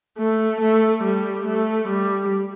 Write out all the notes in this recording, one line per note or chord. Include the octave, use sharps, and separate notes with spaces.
A3
A3
G3
A3
G3